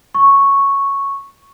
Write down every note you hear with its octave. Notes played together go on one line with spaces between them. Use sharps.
C#6